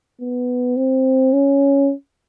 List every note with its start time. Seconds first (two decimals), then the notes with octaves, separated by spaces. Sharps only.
0.21 B3
0.77 C4
1.33 C#4